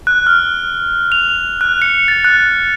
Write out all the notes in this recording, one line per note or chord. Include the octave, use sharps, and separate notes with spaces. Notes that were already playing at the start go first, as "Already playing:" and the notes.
F#6
F6
F7
F#6
C#7
A6
F#6